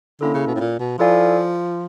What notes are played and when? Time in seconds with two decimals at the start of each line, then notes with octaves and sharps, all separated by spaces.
0.21 D3 A#3 C#4 E4 A4
0.34 C#3
0.47 B2
0.55 A2
0.60 A#2
0.79 B2
0.99 F3 E4 A4 D5 F5 G#5